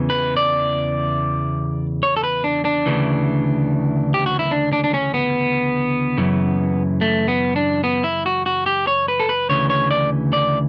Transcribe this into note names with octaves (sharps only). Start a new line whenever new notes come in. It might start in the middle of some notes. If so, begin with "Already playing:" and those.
Already playing: E2 C#3 E3
B4
D5
C#5
A4
B4
D4
D4
D2 C#3 E3
G4
F#4
E4
D4
D4
D4
C#4
B3
F#2 C#3 E3
A3
B3
D4
B3
E4
F#4
F#4
G4
C#5
B4
A4
B4
D2 C#3 E3 C#5
C#5
D5
D5